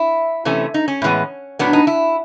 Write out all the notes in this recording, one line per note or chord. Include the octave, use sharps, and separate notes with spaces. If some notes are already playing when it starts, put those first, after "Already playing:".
Already playing: E4
C3 E3 A3 C#4
D#4
C#4
A2 E3 G#3 B3
A2 F#3 B3 D4
D#4
E4